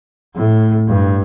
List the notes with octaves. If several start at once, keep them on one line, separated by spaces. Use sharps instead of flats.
A2
G2